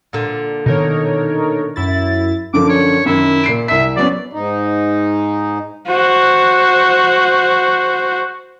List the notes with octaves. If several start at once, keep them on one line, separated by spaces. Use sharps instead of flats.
A#2 D3
B2 D#3 D#4 A#4 C#5
F#2 E4 A6
F#2 D3 F3 D6
C#5
F#2 D#3 E4
A#2 C7 D7
C2 E5 B6
F#3 B3 C#4 D5
G#2 D#4
F#4 C5